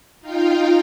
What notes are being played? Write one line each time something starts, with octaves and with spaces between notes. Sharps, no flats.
D#4 F4 F5 G5